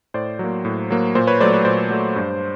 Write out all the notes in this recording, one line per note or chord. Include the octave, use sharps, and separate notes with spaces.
A2 C5 D5
F#3 A#3
A2
F#3 A#3
A#2 C5
B4 C#5
F#3 A3 C5 D5
B4 C#5
A#2 C5 D5
F#3 A3
G2